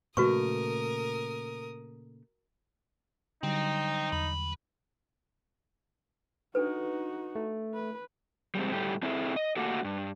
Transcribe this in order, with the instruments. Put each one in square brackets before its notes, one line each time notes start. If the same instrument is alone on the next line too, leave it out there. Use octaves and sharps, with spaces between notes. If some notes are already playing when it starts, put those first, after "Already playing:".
[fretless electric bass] A#2 C#3 A3 [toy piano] F#4 B4 C#6 [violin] A#4 D#6
[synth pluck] D3 F#3 G3 [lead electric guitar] C4 [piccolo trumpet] D#4
[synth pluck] E2 [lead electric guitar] B4
[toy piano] D4 A4 B4 [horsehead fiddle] D#4 F#4
[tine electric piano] A3
[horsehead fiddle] B4
[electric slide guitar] G3 G#3 C4
A2 G3 A3 G4
C4 E4 G#4 A4 E5
D#5
A3 A#3 F#4 G4 A4
G2